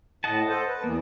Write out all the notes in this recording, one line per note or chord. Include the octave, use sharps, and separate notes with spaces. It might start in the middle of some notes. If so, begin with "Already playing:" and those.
A2 D#5 F#5 A5
A4 C5
B4
E2 E3 A#3 B3